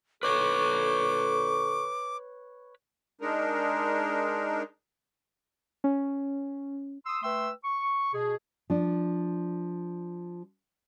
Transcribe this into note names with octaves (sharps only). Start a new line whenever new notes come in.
A#2 D3 A4 B4 C#5 C#6 D6
G#3 D4 D#4 A#4
C#4
C6 D#6 E6
A3 B4 G5 C6 E6
C#6
B2 G#4
F3 D4